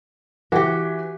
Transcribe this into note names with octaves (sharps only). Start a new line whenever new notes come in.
E3 F#4 G4